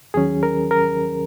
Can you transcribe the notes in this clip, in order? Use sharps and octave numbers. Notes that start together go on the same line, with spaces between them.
D#2 D#3 F#3 C#4 G#4
A#4
A#4